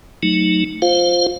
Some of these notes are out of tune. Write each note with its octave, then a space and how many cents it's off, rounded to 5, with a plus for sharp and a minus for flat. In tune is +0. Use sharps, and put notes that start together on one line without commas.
F#3 -5 A3 +0 D#4 +5
F4 +0 C5 +0 F5 +15